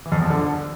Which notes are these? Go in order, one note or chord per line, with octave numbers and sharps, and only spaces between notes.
E3
F2
E2
F3
D3